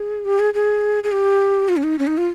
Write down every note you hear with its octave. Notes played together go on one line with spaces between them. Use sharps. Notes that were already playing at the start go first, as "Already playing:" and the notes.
Already playing: G#4
G4
G#4
G#4
G#4
G4
F4
C#4
D#4
C#4
D#4
F4